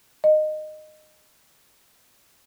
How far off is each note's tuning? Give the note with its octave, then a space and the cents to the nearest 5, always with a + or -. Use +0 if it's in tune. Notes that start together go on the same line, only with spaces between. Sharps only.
D#5 -20